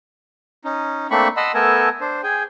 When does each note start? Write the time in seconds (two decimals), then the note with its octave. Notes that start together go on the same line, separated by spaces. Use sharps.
0.65 C#4 D#4
1.11 A3 A#3 C4 D4 B5 C#6
1.37 D#5 F#5 A5 B5 C6 E6
1.54 A3 B3 A4 A#4 G#5 A5
2.01 D4 C5
2.23 G#4 G5 G#5